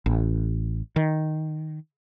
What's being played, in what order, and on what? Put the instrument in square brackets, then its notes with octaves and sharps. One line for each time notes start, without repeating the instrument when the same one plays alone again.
[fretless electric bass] A1
D#3